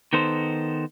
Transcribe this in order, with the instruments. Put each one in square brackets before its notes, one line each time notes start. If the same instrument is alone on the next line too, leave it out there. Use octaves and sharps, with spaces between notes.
[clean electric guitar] D#3 B3 D#4 A4 C5